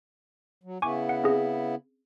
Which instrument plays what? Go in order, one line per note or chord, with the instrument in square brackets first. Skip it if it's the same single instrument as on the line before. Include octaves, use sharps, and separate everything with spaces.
[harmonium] F#3
[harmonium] C#3 B3 E4 [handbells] G#5 C#6 D6
[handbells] F#5
C4 C#4 G#4